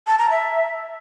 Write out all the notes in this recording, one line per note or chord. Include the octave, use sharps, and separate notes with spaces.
A5
A#5
E5